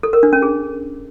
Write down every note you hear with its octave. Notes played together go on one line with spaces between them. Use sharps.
A4
A#4
D4
C#4
G#4